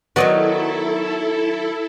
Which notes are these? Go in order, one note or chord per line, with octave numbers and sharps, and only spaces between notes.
D#3 F#3 B3 E4 F#4 A4 D5 D#5